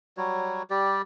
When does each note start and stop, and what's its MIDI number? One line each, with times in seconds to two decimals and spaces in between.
0.17 0.62 54
0.17 0.62 55
0.17 0.62 66
0.17 0.62 73
0.70 1.02 55
0.70 1.02 67
0.70 1.02 74